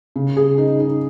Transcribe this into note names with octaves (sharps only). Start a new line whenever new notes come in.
C#3
G#4
D#4
D#4